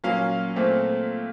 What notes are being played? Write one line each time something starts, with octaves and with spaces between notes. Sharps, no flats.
A#2 F#3 A#3 C#4 F5
A#2 A3 C4